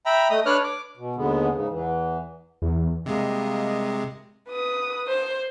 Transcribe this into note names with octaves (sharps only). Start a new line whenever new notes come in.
E5 G5 A#5 B5
A3 D#5 D#6
D4 B4 C#5 D5 F6 F#6
D6
B2
D#2 D3 G#3 B3
G#2 C#3
E2 E3
E2
C3 G3 G#3 A#3 D#5
B4 D#6
C5